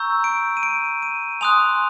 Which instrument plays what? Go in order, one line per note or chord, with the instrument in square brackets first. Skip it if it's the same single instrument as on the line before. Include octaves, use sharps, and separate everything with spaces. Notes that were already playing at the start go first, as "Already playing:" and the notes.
Already playing: [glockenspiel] A#5 C#6 E6 G6
D7
D#7
D7
D#7
G#5 C6 D#6 F#6 F7